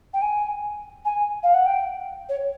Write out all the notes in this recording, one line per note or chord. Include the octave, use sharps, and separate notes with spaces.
G5
G#5
G#5
F5
F#5
G5
C#5